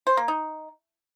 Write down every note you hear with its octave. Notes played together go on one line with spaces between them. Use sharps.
C5
A#3
D#4